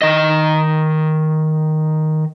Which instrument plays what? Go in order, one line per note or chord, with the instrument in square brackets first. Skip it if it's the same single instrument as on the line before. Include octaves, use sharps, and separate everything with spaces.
[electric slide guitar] D#3 D#5